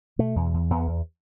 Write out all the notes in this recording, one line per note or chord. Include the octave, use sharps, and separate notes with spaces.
B2 A3
E2
E2
E2 B3
E2